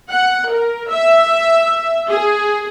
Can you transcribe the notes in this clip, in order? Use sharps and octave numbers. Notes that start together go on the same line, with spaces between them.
F#5
A#4
E5
G#4